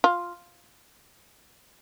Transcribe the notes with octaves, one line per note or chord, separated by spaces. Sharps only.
F4